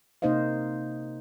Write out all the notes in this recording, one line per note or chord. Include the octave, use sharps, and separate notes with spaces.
C3 A#3 D#4 C5 D#5 F5